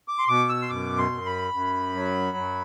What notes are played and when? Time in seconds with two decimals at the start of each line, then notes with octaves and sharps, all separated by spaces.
0.08 D6
0.19 C6
0.28 B2 D6
0.49 E6
0.62 C6
0.70 F#2 D6
0.98 C6
1.12 F#2
1.26 B5
1.54 F#2
1.95 F#3
2.37 F#2